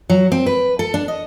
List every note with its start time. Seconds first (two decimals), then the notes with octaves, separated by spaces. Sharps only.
0.10 F#3
0.32 C4
0.46 B4
0.79 A4
0.94 D4
1.08 D#5